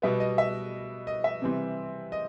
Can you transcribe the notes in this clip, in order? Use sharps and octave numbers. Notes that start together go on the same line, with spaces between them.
B2 G3 B3 E5
D#5
E5
D#5
E5
C3 E3 G3 C4
D#5